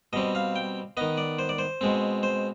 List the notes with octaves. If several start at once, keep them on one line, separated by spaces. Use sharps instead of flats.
B2 G3 C4 D#5
F5
G5
D#3 B3 D#5
D5
C5
D5
C5
B2 G#3 C4
C5